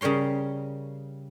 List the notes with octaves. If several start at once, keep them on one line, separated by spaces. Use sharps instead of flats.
C#3 G3 A#4 C#5 C6